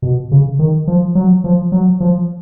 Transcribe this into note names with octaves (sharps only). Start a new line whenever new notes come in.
B2
C#3
D#3
F3
F#3
F3
F#3
F3